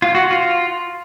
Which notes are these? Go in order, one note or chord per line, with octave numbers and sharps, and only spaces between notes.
F4
F#4
F4